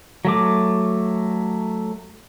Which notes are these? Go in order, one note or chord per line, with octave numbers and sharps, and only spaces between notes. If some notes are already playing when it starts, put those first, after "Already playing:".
F#3 A3 D6